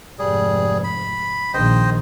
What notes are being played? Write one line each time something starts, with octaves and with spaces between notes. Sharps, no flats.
F1 G#2 G3 G#4
B5
A#1 D#3 C5 D#5 G5